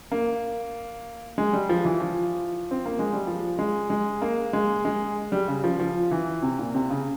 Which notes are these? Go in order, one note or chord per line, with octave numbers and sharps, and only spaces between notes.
A#3
G#3
G3
F3
E3
F3
C4
A#3
G#3
G3
F3
G#3
G#3
A#3
G#3
G#3
G3
C#3
F3
F3
E3
C3
A#2
C3
C#3